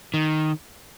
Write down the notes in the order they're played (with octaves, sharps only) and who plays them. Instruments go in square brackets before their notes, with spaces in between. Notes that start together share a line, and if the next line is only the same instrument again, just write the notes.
[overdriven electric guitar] D#3